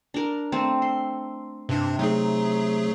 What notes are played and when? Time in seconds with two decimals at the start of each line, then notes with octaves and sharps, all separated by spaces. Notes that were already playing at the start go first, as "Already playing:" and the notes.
0.14 D4 A#4
0.52 A3 C4
0.82 C6
1.69 G2 C3 D4
1.99 F#3 A3 D#4 G#4